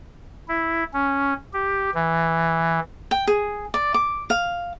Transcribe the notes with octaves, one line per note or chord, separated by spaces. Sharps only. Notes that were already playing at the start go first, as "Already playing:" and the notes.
E4
C#4
G4
E3
G5
G#4
D5
D6
F5